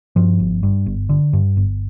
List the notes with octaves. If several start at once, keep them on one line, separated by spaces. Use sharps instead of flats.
G2 F3
G1
G2
G1
D3
G2
G1